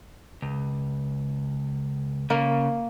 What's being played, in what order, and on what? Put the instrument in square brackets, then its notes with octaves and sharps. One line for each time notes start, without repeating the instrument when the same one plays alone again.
[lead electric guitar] C#2
[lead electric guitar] C#3 [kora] A#3